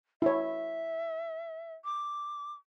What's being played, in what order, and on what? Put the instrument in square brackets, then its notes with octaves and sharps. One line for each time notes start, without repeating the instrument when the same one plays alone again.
[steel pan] E4 C#5 [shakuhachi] E5
[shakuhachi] D6